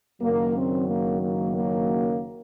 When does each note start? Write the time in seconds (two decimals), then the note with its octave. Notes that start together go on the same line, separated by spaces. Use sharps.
0.21 F#1 F#2 D#3 F#3 A#3
0.54 C4
0.87 A#3
1.20 A#3
1.53 A#3